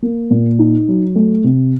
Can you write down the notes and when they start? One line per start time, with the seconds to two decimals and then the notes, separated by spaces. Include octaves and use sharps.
0.02 A#3
0.30 A#2
0.59 D#4
0.88 F#3
1.16 A3
1.44 C3